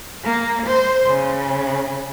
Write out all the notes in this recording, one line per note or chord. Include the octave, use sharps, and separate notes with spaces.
A#3
C5
C#3